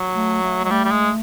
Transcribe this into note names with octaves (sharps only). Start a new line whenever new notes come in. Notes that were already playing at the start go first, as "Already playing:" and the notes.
Already playing: F#3
A3
A3
F#3 G#3
G3 A3
G3
G#3